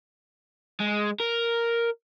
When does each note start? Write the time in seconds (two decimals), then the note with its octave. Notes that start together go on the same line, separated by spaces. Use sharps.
0.80 G#3
1.20 A#4